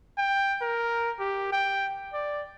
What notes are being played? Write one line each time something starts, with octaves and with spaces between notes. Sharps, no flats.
G5
A#4
G4
G5
D5